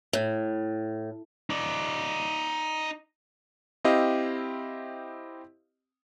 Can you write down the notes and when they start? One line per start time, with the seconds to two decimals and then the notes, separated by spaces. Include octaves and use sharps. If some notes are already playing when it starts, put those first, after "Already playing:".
0.13 A2
1.50 D#4 D5
3.85 C4 E4 G4 D#5 F5